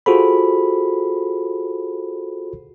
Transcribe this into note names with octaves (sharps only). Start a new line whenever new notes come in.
F4 F#4 G#4 A4 C5 B5